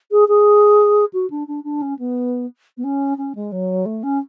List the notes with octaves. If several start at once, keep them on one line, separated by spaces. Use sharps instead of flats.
G#4
G#4
F#4
D4
D4
D4
C#4
B3
B3
C#4
C#4
G#3
F#3
A3
C#4